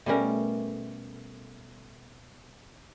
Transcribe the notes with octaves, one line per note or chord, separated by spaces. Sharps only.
B2 G3 A3 C#4 A#4